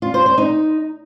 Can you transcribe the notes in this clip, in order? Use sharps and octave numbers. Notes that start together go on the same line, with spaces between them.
F4
C5
C5
D#4